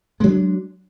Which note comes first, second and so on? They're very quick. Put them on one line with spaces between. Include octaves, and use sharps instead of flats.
G#3 F#3 D4